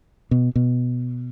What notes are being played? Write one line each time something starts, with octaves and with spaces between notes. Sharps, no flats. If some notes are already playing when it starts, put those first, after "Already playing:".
B2
B2